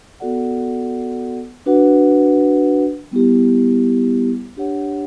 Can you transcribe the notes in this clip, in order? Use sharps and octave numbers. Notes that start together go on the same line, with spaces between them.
B3 F#4 A4 D5 F#5
D4 F#4 B4 F#5
G3 B3 E4 G4
D4 G4 C#5 F#5